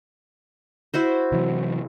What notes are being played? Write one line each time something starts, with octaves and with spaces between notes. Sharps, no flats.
E4 F#4 C5
C3 E3 F#3